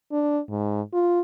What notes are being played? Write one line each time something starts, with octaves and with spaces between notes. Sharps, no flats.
D4
G#2
F4